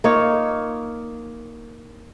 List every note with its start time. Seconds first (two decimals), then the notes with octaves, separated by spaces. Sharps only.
0.04 A#3 D#4 F4 C#5